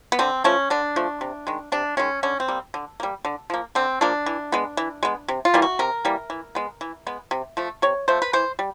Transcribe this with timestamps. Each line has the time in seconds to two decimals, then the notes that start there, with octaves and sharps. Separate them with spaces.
0.12 B3
0.19 D3 C4
0.44 F3 A3 C#4
0.70 D3 D4
0.96 F3 A3
1.21 C3
1.47 D#3 G#3
1.72 C3 D4
1.97 D#3 G#3 C#4
2.23 D3 C#4
2.40 C4
2.48 G3 A#3
2.74 D3
3.00 G3 A#3
3.25 D3
3.50 F3 A#3
3.75 D3 C4
4.01 F3 A#3 D4
4.26 E3
4.52 G#3 B3
4.77 E3
5.03 G#3 B3
5.28 C3
5.45 F4
5.54 E3 G3 A#3
5.62 F#4
5.79 C3 A#4
6.05 E3 G3 A#3
6.30 E3
6.55 G#3 B3
6.81 E3
7.07 G#3 B3
7.31 C3
7.57 F3 A3
7.82 C3 C#5
8.08 F3 A3 C5
8.22 B4
8.33 E3 C5
8.59 G3